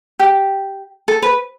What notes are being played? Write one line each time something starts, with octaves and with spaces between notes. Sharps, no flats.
G4
A4
B4